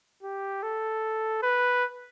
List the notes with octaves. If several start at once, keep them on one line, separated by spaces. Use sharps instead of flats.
G4
A4
B4